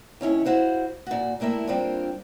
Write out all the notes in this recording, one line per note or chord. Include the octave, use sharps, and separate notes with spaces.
D#2 C#4 E4 C#5
E4 F#4 C5 F5
A#2 F#4
G3 A3 A#3 E4 A4
G3 A#3 C4 D4 F4